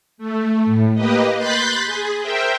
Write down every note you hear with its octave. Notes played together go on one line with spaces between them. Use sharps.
A3
A2
A#3 G4 B4 D#5
B5 C6 F#6 G6 A6 B6
G#4
A#4 C5 E5 G5